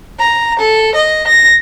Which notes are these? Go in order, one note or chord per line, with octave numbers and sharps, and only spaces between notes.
A#5
A4
D#5
A#6